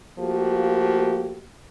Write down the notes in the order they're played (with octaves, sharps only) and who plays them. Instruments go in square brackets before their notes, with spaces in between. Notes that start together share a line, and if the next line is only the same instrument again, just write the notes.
[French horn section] F3 A3 A#3 F#4 G4